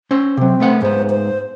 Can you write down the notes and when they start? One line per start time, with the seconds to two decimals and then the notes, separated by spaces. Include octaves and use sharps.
0.11 C#4 C5
0.37 C3 F#3 C4
0.60 A3 B3 F#5
0.82 G#2 B3 C5
1.10 C5